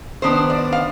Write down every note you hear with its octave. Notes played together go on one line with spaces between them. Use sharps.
D#3 B3 D4 C5
D5
F5